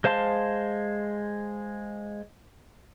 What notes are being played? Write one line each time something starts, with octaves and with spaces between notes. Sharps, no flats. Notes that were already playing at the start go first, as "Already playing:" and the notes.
G#3 C5 F5 A5 C6